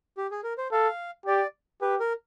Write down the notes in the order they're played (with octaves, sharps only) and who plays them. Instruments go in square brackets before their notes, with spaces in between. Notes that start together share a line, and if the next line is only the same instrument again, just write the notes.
[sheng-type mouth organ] G4
G#4
A#4
C5
[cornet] A4 [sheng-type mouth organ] F5
[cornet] G4 [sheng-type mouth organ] D5
[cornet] G4 [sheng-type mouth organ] B4
[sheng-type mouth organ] A#4